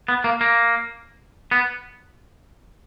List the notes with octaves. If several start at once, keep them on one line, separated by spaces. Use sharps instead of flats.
B3
A#3
A#3
B3